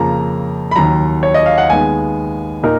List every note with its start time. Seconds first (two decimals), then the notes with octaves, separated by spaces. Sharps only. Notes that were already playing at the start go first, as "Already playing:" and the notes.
Already playing: F2 C#3 F3 A#3 A#5
0.71 B5
0.76 D#2 D#3 F#3 A#5
1.23 C#5
1.34 D#5
1.46 F5
1.58 F#5
1.70 D#2 D#3 G#3 B3 G#5
2.63 A#2 D#4 A#4